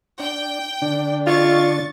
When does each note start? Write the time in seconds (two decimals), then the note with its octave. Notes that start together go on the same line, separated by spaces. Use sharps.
0.20 D4 G5
0.82 D3 D4
1.27 F4 C#6 A6